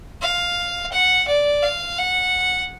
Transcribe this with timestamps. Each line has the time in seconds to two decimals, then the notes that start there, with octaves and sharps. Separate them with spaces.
0.21 F5
0.92 F#5
1.28 D5
1.63 F5
1.99 F#5